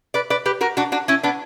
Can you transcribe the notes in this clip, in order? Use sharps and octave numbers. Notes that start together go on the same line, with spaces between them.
B4 D5
B4 D5
G4 B4
F#4 A#4
D4 F#4
D4 F#4
C#4 E4
B3 D4